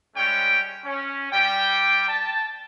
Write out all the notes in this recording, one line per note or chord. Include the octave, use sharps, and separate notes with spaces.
G3 G#3 C#4 C#5 G5
C#4
G3 G4 G5
A5